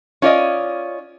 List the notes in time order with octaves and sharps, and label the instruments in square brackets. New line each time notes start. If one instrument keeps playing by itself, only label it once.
[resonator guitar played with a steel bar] C#4 F4 D5 D#5